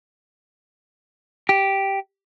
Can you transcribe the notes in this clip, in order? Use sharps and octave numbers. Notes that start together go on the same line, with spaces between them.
G4